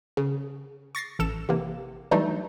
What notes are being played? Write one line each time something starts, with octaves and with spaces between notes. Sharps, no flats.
C#3
C#6 A6 A#6 C7
A1 A4 E7
C3 E3 A#3
E3 F#3 G3 A3 D4 D#4